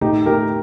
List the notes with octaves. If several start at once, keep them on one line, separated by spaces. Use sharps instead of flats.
A2 D#4 G4
A2 G4 A#4